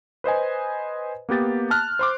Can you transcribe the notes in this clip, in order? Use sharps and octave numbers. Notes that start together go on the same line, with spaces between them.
B4 C5 D#5 G#5
A#3 B3 G4 A6
A5 F6 F#6
C5 C6 D6